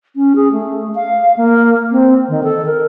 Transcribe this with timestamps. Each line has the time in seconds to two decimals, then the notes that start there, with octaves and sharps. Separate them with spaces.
0.16 C#4
0.36 G#4
0.52 A3
0.95 F5
1.37 A#3
1.92 C4
2.29 D#3
2.44 A4
2.66 A#4